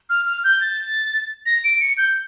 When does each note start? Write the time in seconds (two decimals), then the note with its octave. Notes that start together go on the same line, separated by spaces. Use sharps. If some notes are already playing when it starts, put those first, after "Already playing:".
0.10 F6
0.26 F6
0.44 G6
0.61 A6
1.46 A#6
1.64 D7
1.81 C#7
1.98 G6